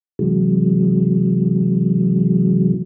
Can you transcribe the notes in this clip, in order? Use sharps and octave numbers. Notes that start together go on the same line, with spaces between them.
C3 E3 F#3 G#3